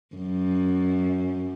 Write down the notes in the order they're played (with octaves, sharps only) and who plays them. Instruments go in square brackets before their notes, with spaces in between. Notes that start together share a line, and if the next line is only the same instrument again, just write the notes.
[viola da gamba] F#2